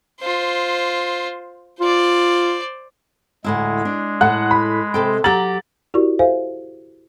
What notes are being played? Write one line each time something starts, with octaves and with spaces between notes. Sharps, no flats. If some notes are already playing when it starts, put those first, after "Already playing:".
F4 C5
F4 C5 D5
D2 A2 G#3 E4
D4
A2 A4 F#5 F#6
B5
C3 A4 G5
F#3 G4 A#5 A6 F#7
E4 F#4 G4 A#4 D5 C#6
A4 C5 E5 F5 G#5